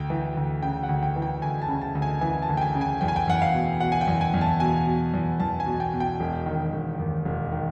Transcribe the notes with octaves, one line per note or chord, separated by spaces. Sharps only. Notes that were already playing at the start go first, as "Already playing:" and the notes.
Already playing: D2 G5
E3
D2
C#3 G5
F#5
D2
G5
E3
G5
D2 G#5
A5
C#3
A5
D2
G#5
E3 G#5
A5
D2
G5
G#5
C#3
G#5
E2 G5
G#5
G5
E2 F#5
F5
B2
B2 F#5
G#5
G5
E2
G#5
E2
A5
B2 G#5
B2
E2
E2 A5
G#5
B2
G5
B2
G5
E1
D#3
E1
D#2
E1
D#3